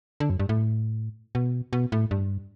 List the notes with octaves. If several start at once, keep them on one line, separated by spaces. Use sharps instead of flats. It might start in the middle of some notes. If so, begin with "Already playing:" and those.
D3
F#2
G2
A2
B2
B2
A2
G2